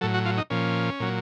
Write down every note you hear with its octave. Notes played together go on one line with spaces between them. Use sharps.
A2 F#3 A4
F#4
F4
D#4
A#2 F3 C#4
A#2 F#3